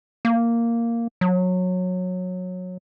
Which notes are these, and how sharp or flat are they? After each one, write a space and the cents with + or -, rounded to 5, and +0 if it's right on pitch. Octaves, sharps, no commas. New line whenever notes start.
A#3 -5
F#3 -20